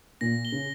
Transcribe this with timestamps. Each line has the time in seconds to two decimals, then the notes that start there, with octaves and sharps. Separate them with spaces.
0.21 A#2 A#6
0.45 G7
0.52 C#3